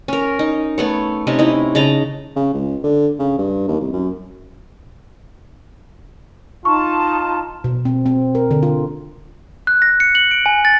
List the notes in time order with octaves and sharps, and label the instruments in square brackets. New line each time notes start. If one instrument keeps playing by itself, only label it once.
[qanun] C#4 A#4
D#4
A3 B3 C#5
C3 C#4 D#4
D#4 E4
C#3 D#5 A5 A#5
[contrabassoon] C#3
C#2
D3
C#3
G2
D#2
C2
F#2
[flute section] D#4 A5 [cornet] F4 [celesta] C#6
[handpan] B2
C4
C4
A#4
D3
F4
[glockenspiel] F#6
A#6
C#7
F#7
D7
G#5
A6